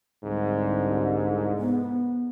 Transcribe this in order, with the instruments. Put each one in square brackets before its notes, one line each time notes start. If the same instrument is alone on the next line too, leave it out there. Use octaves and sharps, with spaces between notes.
[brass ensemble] C2 D3 [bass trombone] G#2
[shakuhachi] B3